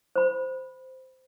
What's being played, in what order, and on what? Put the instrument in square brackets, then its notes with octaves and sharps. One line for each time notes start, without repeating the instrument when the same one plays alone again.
[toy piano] C5 B5